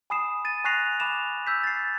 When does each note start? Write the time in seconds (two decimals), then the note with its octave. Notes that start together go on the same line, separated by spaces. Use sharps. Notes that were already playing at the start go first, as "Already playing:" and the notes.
0.10 G#5 B5 D#6 C7 E7
0.45 A6 D#7
0.64 G#5 C#6 F#6 A#6 C7 F7
1.00 G#5 B5 D6 E7 F7
1.47 E6 G6 B6
1.64 A6 C7